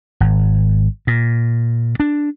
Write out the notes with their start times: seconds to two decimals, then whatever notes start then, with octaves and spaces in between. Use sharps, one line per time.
0.20 G#1
1.07 A#2
2.00 D4